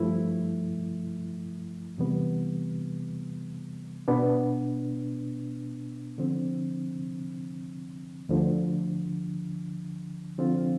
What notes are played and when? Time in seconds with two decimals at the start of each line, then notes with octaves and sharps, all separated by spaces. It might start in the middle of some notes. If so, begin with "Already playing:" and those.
Already playing: G2 F3 A3 E4
1.98 E2 C3 E3 G3 B3
4.08 B2 B3 D4
6.18 D3 F3 C4
8.29 D2 D3 F3
10.38 D3 F3 C4 F4